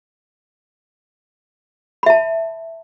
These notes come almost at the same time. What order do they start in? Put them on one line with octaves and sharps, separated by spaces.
B5 E5 A5